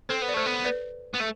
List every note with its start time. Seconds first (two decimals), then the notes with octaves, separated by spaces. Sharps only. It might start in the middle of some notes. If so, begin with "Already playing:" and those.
0.09 C4 A4 C5
0.22 B3
0.28 D5
0.34 A3 A4 C5
0.46 B3
0.65 B4 D5
1.15 B3
1.21 A3